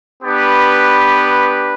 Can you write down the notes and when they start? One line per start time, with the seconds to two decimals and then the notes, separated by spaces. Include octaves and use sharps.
0.23 B3 D4 G4 B4